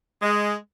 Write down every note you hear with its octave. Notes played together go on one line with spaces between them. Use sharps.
G#3